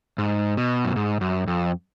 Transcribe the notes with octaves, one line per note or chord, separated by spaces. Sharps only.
G#2
B2
F#2
G#2
F#2
F2